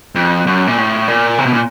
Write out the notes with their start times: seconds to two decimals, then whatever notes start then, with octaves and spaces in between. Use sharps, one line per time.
0.15 F2
0.47 F#2
0.67 A#2
0.77 A2
1.08 A#2
1.38 C3
1.46 B2
1.53 A#2